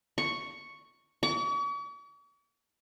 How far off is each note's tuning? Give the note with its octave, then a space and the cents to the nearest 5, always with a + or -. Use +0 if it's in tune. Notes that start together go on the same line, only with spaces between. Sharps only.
C#6 +0
C#6 +45